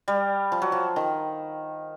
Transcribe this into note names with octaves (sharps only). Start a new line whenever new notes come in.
G3
F3
F#3
F3
D#3